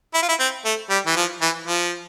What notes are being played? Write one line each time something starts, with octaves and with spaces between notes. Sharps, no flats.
E4
F4
E4
C4
A3
G3
E3
F3
E3
F3